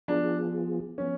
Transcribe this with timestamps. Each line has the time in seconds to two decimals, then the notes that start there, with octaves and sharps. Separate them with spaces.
0.08 F3 B3 D4 F4 G#4
0.98 F3 B3 C#4